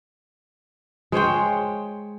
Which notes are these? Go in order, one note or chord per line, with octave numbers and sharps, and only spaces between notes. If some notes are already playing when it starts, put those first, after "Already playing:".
G#3 C5 C#5 G5